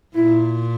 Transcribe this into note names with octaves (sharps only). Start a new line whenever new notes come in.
A#2 E4